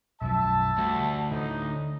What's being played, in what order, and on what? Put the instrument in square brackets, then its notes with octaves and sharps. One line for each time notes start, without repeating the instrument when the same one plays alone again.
[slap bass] B1 F#2 F3 [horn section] E5 A5
[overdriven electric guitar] D2 [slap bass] G3
[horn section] A2 D#4 [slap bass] D3